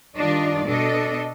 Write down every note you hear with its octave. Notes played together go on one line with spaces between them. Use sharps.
D#3 G3 D4 F4 D5 D#5
B2 D4 A4 D#5